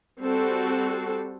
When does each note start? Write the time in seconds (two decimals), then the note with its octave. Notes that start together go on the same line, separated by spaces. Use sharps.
0.21 G3 C4 F#4 A4